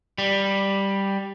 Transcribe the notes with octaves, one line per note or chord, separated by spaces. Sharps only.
G3